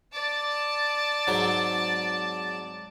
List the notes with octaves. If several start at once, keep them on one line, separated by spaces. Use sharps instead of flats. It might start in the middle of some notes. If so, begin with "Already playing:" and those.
D5 A5
G#2 F#3 C4